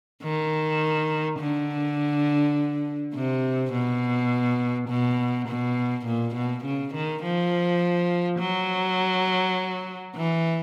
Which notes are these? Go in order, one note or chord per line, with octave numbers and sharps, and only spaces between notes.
D#3
D3
C3
B2
B2
B2
A#2
B2
C#3
D#3
F3
F#3
E3